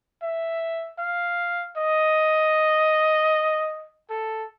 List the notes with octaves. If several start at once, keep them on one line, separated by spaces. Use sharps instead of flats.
E5
F5
D#5
A4